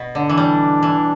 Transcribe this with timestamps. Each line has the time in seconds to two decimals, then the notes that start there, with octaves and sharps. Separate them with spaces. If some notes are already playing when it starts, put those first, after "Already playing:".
Already playing: B2
0.15 D3
0.26 E3 D4
0.38 G3
0.83 E3